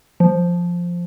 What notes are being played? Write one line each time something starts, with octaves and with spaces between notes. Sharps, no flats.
F3